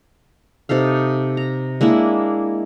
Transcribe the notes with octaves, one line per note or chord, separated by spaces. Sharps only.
C3 D#4 A4 F5
A#5
G#3 A#3 D4 E4